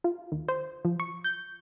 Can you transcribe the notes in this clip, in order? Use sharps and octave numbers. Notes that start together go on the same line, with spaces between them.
F4
D#2
C5
F3
C#6
G6